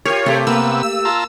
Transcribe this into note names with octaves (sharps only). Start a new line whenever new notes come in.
F4 G4 A#4 C#5
C3 A3 G4 A4
C3 A#3 B3 E6
E6
F4 A5 A#5